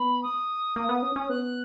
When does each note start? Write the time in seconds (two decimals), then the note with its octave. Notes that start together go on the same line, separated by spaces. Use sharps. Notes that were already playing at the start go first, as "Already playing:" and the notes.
Already playing: B3 B5
0.22 D#6
0.76 A#3
0.89 B3
1.02 C#4
1.16 C#4
1.29 B3 F#6